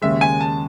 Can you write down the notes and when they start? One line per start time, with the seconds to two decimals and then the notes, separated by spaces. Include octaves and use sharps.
0.02 D#2 C#3 G#3 E5
0.21 G#5
0.41 A5